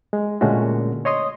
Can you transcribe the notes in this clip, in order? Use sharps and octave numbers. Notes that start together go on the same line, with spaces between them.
G#3
A#2 D3 G#3 A3 C#4 F#4
C#5 D#5 C6 D#6